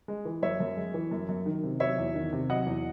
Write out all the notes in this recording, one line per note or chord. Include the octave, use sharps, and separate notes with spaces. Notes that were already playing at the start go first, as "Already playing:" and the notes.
G#3
E3
F#2 C#5 E5
F#2
G#3
E3
F#2
F#2
D#3
C3
F#3 C#5 E5
E2
D#3
C3
F#3 D#5 F#5
E2